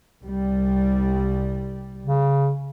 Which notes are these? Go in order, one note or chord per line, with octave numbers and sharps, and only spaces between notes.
C2 G3
C#3